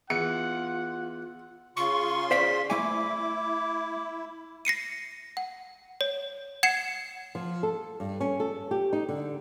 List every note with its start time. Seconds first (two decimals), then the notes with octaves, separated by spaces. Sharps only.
0.10 E2 F4 F#5 C#7
1.77 C#3 F4 C6 C#6
2.31 C5 D5 F5 B6
2.70 A3 E4 G#5 D6
4.65 A#6 C7 C#7 D#7
5.37 F#5
6.01 C#5
6.63 F#5 G#6 C7 C#7 E7
7.35 F3
7.63 A4
8.00 G2
8.20 C#4
8.40 A4
8.71 G4
8.93 D#4
9.09 D3